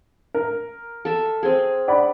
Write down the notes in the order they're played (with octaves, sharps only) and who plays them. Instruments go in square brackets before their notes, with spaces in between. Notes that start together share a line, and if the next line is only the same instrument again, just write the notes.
[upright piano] A#4
[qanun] A4 E5
C4 G#4
[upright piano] D5 F#5 B5